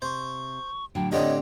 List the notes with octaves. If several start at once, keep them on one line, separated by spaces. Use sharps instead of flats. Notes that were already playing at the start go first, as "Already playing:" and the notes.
C3 C5 C#6
A2 D3 F#3 G5
A2 D3 C4 D4 G4 C#5 D#5